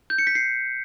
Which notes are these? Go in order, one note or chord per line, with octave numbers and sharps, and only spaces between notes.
G6
C#7
B6
C7